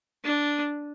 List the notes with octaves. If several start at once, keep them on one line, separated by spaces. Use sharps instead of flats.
D4